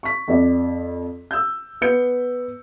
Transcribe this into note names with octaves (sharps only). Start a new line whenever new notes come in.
C#6 B6
F2 D5
E6 G6
B3 B4 G6 C#7